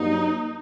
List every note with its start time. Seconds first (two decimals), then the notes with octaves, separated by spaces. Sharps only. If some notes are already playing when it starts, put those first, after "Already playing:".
Already playing: G2 F#3 A#3 D#4